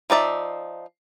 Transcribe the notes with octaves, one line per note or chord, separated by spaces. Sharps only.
F3 D#4 D5 E5